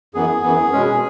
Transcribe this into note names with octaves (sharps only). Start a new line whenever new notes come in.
F#2 E3 B3 G#4
F#2 E3 B3
B2 G#3 C#4